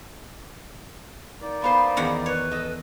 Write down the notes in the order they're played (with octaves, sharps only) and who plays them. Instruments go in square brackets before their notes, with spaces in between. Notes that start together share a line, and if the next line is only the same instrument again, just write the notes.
[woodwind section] A#3 D#4 D5
[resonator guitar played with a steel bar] B2 B3 C5 [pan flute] F5
[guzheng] E2 D#3 F#5
[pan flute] B4 [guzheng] C#5
[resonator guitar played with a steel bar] A4 D#5